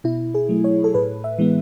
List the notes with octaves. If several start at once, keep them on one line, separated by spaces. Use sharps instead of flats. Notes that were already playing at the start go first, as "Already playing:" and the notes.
B2 E4
G#4
F#3 A3
C#5
A4
A2 B4
E5
E3 G#3 B3